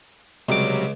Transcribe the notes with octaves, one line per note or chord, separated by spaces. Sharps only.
C#2 C3 F#3 G3 D6